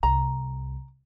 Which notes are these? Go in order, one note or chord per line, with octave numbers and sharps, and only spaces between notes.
C2 A#5